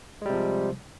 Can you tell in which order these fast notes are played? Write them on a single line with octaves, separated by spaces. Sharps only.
G#3 G3 C3 F3